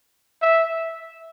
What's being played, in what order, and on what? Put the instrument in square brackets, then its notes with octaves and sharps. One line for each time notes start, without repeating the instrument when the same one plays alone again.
[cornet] E5